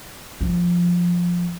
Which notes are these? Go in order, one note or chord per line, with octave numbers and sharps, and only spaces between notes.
F3